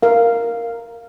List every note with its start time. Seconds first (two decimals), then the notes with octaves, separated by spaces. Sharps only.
0.03 A#4 F5